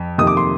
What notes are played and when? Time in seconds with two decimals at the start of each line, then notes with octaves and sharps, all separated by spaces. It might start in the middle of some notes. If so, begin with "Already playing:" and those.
Already playing: F2
0.18 F2 C3 D#3 A#3 D#6
0.27 D6
0.37 C6